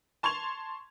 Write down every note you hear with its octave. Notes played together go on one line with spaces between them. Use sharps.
A5 C6 C#6 G#6 F7